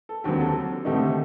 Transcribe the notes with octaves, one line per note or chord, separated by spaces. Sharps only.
A4
D#2 D3 F#3 C4 G4
A4
D2 C3 D#3 A3 D#4 G4